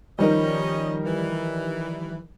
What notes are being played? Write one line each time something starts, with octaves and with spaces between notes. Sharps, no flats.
D#3 F3 G3 C#4 D#4 A#4 D#5
E3